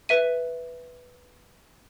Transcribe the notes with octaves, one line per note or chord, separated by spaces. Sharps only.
B4 E5 D#7